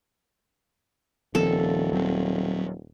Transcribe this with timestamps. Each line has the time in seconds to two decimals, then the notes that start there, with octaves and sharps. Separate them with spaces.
1.35 D#1 D#3 F3 C4 A4
1.93 F#3 C4